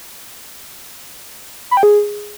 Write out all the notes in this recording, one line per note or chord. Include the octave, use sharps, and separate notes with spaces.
B5
G5
G#4